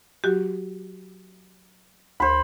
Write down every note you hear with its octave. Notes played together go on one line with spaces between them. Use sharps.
F#3 F#4 G4
D2 C5 B5